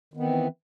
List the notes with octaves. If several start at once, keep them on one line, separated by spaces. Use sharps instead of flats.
D#3 E3 B3 C4